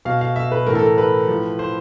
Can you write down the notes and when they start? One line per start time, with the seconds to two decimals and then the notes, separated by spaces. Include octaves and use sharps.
0.05 B2 F5
0.21 F5
0.36 E5
0.52 B4
0.67 A2 E3 A#4
0.75 A4
0.82 A#4
0.98 B4
1.28 A2 F3
1.59 C5